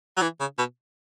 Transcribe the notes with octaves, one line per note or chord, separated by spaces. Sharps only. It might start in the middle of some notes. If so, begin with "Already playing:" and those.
F#3
E3
C#3
B2